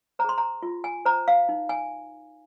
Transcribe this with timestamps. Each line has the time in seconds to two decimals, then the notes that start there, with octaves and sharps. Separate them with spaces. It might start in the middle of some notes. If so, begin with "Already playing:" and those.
0.19 C5 A#5
0.24 G#4 C6
0.38 A#5
0.63 F4
0.84 G#5
1.05 C5 A#5
1.28 F5
1.49 D#4
1.69 G#5